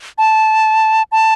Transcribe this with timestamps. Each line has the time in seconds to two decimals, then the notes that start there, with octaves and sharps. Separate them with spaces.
0.18 A5
1.12 A5